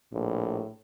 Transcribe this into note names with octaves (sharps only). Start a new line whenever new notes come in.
A#1 A2